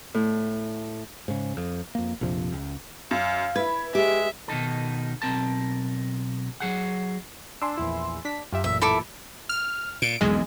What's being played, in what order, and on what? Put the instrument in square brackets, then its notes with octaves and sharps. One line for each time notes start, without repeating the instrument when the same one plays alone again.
[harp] A2
[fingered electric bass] G#2 C#3
F2
F2 A#3
A#1 F2 C3 F3
C#2
[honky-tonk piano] F#2 [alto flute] F5
[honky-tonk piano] E4 G#6 [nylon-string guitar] B4
[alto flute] G#3 [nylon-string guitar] G4 [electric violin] E5
[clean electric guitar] B2 D#3 D#4 A4
B1 G2 C4 A#4 A5
F#3 G#4 F#5
[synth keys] D4 [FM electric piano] G#5 C6 E6
[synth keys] A#1 E2 E4
D4 B6
[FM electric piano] F#2 [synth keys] F4 G4 E5
[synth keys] A1 A#2 [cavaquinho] E5
[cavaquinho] E4 A4 D6
[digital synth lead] F6
[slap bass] A#2 [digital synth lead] D7
[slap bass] E1 B1 F2 [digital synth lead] G#3